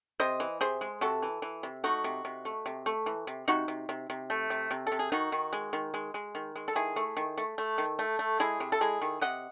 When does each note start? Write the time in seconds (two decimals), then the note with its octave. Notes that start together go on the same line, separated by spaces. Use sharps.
0.20 C3 C5 D#5
0.40 E3
0.61 C3 G#4 C5
0.81 G#3
1.01 C3 F#4 A4
1.22 E3
1.42 E3
1.63 C3
1.84 A3 D#4 F#4
2.04 C3
2.25 C3
2.45 A3
2.66 C3
2.86 A3
3.06 E3
3.27 C3
3.48 C3 D#4 F#4
3.68 C3
3.89 C3
4.10 C3
4.30 A3
4.50 C3
4.71 C3
4.87 A4
4.92 C3
4.99 G#4
5.12 D#3 D#4 F#4
5.32 D#3
5.53 G#3
5.73 D#3
5.94 G#3
6.14 G#3
6.35 D#3
6.56 G#3
6.68 A4
6.75 D#3 E4 G#4
6.96 A3
7.17 D#3
7.37 A3
7.58 A3
7.78 D#3
7.99 A3
8.19 A3
8.40 G#3 E4 G#4
8.60 C3
8.72 A4
8.81 G#3 E4 G#4
9.02 D#3
9.21 C3 D#5 F#5